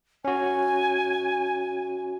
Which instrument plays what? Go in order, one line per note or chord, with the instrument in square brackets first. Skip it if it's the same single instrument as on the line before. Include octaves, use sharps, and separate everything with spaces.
[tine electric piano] C#4 F#4 [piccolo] G#5